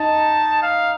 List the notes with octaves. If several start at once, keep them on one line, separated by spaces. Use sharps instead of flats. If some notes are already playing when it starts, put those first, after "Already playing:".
Already playing: D#4 A5
F5